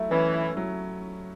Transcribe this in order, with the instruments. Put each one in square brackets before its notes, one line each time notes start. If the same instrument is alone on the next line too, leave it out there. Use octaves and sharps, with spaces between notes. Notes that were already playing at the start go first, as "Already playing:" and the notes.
Already playing: [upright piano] F#3 A3 E4
[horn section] E3 [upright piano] C#4
[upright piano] E4
F#3